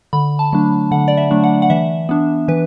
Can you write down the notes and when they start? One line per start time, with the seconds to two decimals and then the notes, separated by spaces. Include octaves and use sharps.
0.13 D3 B5
0.39 A5
0.53 F#3 A3 D4
0.91 D3 F#5
1.08 D5
1.17 E5
1.31 F#3 A3 D4
1.44 F#5
1.62 F#5
1.70 E3 E5
2.09 B3 D4
2.48 E3 B4